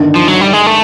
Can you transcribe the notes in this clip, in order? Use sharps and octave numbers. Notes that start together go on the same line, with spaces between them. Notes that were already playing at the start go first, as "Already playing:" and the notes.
Already playing: G1 G2 D#3
F3
F#3
G3
G#3
A3